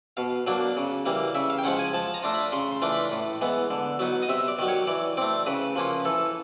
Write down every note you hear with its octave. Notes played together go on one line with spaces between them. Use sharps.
B2 F5
F#3 A#3 D4
C#3
E3 G3 A#3
C#3 E5
F5
G5
F3 G#3 C#4 F#5
G#5
F3 A5
A#5
A3 D4 F4
B5
C#3 C6
C6
E3 A3 D4 F4
B5
A2
E3 G#3 B3
D3
F#3 B3 D#4
D#5
C3 E5
D5
D#3 F#3
C#5
E3 D5
A3 C4 D5
C#3 B4
F3 A#3 C#4 F4
E3 A4